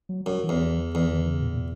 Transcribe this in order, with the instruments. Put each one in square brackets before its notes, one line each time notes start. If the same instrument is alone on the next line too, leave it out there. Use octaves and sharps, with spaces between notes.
[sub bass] F#3
[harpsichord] F#2 [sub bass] F#3
[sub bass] E3
[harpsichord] E2
[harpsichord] E2 [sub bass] E3
[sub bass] D#3
D#3
C#3
A#2
A#2